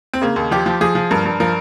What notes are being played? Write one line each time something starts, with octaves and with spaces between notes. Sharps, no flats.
C4
C#3 A#3
D#2
F3 G4
F3
F3 G#4
F3
G2 A#4
G2
F3 A#4